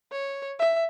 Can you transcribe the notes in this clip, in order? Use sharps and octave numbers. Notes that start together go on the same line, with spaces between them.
C#5
E5